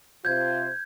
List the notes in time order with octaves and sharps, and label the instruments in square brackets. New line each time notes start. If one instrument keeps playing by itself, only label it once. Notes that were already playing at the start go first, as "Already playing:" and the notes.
[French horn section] C3 F4 C5 [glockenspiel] G6 G#6